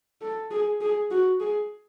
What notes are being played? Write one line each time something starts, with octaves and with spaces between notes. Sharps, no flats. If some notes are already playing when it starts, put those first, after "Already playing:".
A4
G#4
G#4
F#4
G#4